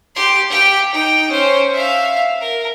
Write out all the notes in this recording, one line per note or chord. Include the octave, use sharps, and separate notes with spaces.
G4 C6
G4 G5
D#4 G5
C#4 C5
E5 F5
A#4